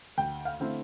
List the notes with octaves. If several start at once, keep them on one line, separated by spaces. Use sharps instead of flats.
D2 G5
F5
D3 A3 C4 E4